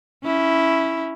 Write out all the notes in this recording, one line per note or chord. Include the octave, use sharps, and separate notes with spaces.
C#4 E4